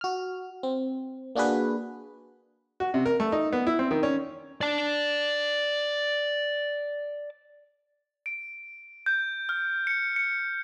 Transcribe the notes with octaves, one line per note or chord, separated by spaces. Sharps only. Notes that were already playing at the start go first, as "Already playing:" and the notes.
F#4 F6
C4
A#3 D4 F#4 G#4 B4
F#4
C3
A#4
A3
D#4
B3
E4
C4
D#3
C#4
D5 A5
D7
G6
F6
C#7
C#7